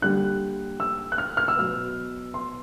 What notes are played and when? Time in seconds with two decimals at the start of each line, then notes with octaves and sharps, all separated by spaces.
0.02 D3 G3 A#3 F#6
0.80 E6
1.12 F#6
1.18 F6
1.37 F6
1.48 E6
1.57 B2 F#3 B3 F6
2.34 C6